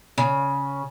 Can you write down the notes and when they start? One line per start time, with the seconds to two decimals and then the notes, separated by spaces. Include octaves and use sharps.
0.18 C#3